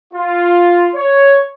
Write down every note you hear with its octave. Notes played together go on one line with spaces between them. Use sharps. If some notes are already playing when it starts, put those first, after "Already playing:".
F4
C#5